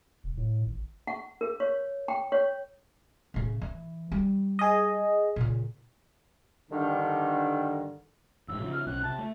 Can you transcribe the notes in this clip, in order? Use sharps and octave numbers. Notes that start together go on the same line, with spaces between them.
E1
A2
G#1
F#5
A#4
C#5
G5
C#5
A2 C#3
E3
G3
G#4 D#5
A#2 C#3
G2 D3 D#3
A1 G#2 E6
C#3 F3
F6
B1 C#4 F#6
C3 A5
A3